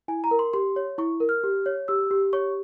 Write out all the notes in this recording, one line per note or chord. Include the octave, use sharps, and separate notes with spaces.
E4 G#5
A#5
A#4
C6
G4 C6
C#5
E4 C#6
A#4
F6
G4
C#5
G4 E6
G4
C#5 C#6